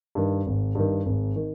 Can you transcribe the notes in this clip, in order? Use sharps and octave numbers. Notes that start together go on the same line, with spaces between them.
G2 D#3
G#1
G2 D#3
G#1
D#3